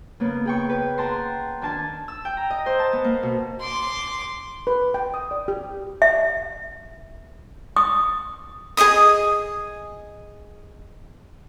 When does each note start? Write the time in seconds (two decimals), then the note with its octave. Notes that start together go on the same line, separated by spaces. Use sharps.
0.20 C#3 A#3 B3
0.45 G#4 G5 C#6
0.69 B4
0.98 A#4 F#5 G5 A5 A#5 C6
1.61 D#3 D4 G#5 A5
2.08 E6
2.25 G5
2.37 A#5
2.50 D#5
2.66 C5
2.79 A5
2.93 B3
3.04 A#3
3.23 B2
3.61 C6 D6
4.67 B4
4.94 G5
5.14 D#6
5.31 D5
5.48 G4
6.02 E5
7.76 D#6
8.77 G#4 C#5 D#5 D#6